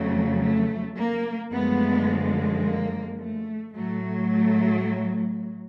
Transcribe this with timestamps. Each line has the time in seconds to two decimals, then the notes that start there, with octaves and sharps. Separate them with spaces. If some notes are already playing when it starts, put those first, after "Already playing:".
Already playing: F2 C#3 F#3 A3
0.41 A3
0.96 A#3
1.52 F#2 D3 F3 G#3 A3 B3
2.63 A#3
3.19 A3
3.74 A2 F#3 A3
4.30 A3